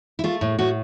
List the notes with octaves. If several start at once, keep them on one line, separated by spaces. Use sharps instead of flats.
E4
A3 F4
A2
A2 F#4